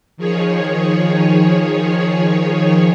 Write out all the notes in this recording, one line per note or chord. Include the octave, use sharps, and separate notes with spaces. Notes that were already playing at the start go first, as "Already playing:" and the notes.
D#3 F3 G#4 C#5